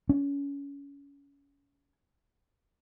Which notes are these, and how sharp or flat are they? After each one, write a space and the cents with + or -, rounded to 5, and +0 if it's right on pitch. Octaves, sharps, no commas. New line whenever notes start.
C#4 +25